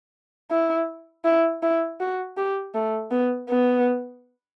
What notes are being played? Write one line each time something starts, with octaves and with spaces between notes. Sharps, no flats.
E4
E4
E4
F#4
G4
A3
B3
B3